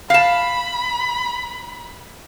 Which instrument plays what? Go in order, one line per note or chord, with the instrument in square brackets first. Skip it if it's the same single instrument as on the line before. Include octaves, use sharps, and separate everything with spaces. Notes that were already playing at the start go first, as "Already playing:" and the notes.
[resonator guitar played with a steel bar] F5 A5 [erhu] B5